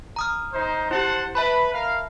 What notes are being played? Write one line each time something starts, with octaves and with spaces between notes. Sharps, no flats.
A#5 D#6 F6
D#4 C5
E4 G4 C5 F#5 A5
B4 E5 A5 B5
A#4 F5